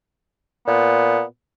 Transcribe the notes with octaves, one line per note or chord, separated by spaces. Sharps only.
A#2 B3